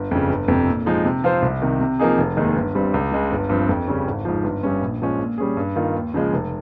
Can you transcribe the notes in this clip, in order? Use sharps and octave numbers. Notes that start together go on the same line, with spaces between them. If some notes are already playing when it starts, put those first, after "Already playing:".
Already playing: G1
F2 C#3
G1
F2 C3
A#2
F3 G#3 D#4
C3
F3 C4 F4 C5
C2
C3 D#3
C3
F3 A#3 D#4 G#4
F1
D#2 D#3 G#3 D#4
G1
G2 G3 C4
C#2
C#3 G#3
G1
G2 F3 C4
F2
C#3 G3 C#4
G#1
G#2 F3
G1
G2 G3 C#4
A#1
A#2 F3 G#3 C#4
A#2
G3 C#4 G#4
G2
D#3 A#3 F4
D#2
C#3 F3 G#3
F1